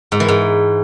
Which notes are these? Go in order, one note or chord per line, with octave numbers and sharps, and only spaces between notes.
G#2
E3
G#2